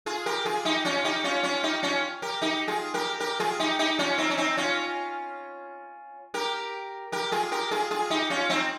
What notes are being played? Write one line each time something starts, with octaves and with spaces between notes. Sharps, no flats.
F4 G#4
G4 A#4
F4 G#4
D#4 G4
C#4 F4
D#4 G4
C#4 F4
C#4 F4
D#4 G4
C#4 F4
G4 A#4
D#4 G4
F4 G#4
G4 A#4
G4 A#4
F4 G#4
D#4 G4
D#4 G4
C#4 F4
C4 D#4
C#4
C4 D#4
C#4 F4
G4 A#4
G4 A#4
F4 G#4
G4 A#4
F4 G#4
F4 G#4
D#4 G4
C#4 F4
C4 D#4